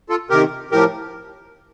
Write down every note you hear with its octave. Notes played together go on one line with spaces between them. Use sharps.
F4 A4
C3 D#3 G4 A#4
A2 F3 G4 A#4